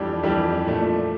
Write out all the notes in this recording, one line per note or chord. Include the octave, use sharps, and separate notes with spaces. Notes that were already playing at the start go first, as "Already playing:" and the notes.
Already playing: F2 E3 G3 D4 G4
F2 E3 G3 D4 G4
A#2 F3 A3 D4